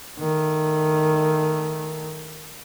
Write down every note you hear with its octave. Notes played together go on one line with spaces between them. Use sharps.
D#3 A3